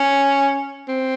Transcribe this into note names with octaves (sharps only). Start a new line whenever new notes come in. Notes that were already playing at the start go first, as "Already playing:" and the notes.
Already playing: C#4
C4